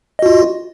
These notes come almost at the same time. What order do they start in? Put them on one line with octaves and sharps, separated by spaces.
D#5 F#4 F4